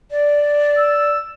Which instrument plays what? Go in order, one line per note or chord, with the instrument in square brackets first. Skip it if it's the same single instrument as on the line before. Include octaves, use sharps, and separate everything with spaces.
[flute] D5
[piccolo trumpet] E6